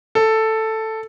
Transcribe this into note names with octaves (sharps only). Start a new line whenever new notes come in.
A4